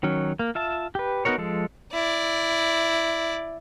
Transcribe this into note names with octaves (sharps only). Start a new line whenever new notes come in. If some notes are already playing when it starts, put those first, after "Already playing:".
D#3 F#3 C#4
A#3
F4 E5 A5
G4 B4
B3 D#4 F#4 A#4 C#5
F3 G#3 A4
E4 D5